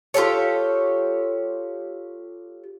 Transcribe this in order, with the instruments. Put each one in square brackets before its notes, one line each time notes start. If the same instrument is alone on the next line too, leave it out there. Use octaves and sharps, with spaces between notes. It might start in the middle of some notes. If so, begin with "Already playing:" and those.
[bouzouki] F4 G4 A4 C#5